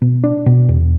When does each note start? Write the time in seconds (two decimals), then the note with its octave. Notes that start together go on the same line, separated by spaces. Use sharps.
0.02 B2
0.24 D4
0.46 B2
0.69 E2